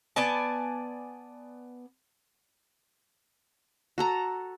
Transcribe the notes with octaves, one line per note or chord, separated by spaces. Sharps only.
B3 D5 G#5 A5
F#4 A4 A#5